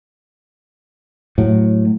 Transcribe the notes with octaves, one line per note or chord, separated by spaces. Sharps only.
A2 F#3